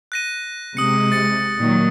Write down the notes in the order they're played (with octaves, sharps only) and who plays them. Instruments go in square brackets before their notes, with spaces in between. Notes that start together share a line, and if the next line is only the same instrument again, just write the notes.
[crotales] F#6 A#6 D#7
[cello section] C3 G#3 [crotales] D#6 C#7
[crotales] A6 C#7
[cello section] A#2 D#3 F#3